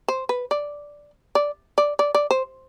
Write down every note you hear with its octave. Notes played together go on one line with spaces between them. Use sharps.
C5
B4
D5
D5
D5
D5
D5
C5